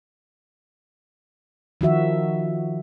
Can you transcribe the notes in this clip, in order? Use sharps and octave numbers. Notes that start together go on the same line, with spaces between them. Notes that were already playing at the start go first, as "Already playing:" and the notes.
D#3 F3 F#4 E5